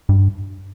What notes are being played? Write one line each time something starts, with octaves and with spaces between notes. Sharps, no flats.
G2